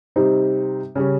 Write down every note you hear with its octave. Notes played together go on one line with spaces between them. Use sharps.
C3 G3 C4 D#4
C#3 G3 C#4